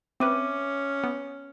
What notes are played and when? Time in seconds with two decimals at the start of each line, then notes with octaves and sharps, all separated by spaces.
0.20 C4 C#4 B4 E5 D6 D#7
1.04 B3